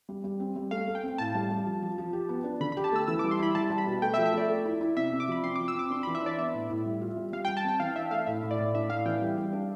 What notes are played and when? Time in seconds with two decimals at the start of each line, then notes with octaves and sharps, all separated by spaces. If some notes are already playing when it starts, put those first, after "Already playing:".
0.09 G3
0.24 G3
0.40 C4
0.56 G3
0.71 A3 F5
0.87 A3
0.95 G5
1.03 C4
1.18 A2 A5
1.35 G3
1.50 G3
1.66 F3
1.82 F3
1.98 F3
2.13 G4
2.29 B3
2.44 D4
2.61 D3 B5
2.72 B5
2.77 G4
2.84 A5
2.92 A3 E6
3.08 E3 E6
3.19 D6
3.24 G3
3.31 C6
3.39 E4 B5
3.55 G3 A5
3.70 G3
3.78 B5
3.87 B2
4.02 A3 G5
4.14 E5
4.18 F3
4.26 E5
4.33 A3 D5
4.49 A3
4.66 E4
4.81 E4
4.97 C3 E5
5.12 C3
5.20 D6
5.28 F3 B5
5.44 C4 C6
5.56 D6
5.60 F3
5.68 E6
5.75 C4 D6
5.90 D4 C6
6.03 B5
6.07 E3
6.15 E5
6.22 D4 D5
6.38 B3 E5
6.54 A2
6.70 A2
6.85 G3
7.01 F4
7.17 G3
7.33 G3 F5
7.45 G5
7.48 G3
7.57 A5
7.64 C4 G5
7.80 E3 F5
7.96 D4 E5
8.11 A3 F5
8.26 A2 E5
8.43 A2
8.51 D5
8.59 A2
8.74 D4 E5
8.90 A2 F5
9.06 E3 G5
9.22 G3
9.38 G3
9.53 D4